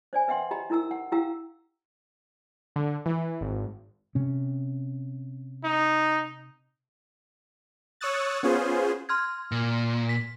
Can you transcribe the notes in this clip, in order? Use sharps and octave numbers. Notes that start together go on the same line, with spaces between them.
C5 D5 G#5
B4 E5 F#5 G5 C6
G4 D#5 A#5 B5
D#4 E4 A#4 A#5 E6
F#5
E4 G4 F5 G5 A#5 E6
D3
E3
G#1
C3 C#4
D#4
C#5 C#6 D#6 E6 F#6 A6
B3 C#4 F4 G#4 C5
C6 F6 G#6
A#2
B6